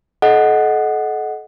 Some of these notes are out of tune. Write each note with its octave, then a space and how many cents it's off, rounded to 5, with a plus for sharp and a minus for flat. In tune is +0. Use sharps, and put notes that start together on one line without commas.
A4 -35 D#5 +0 F#5 +0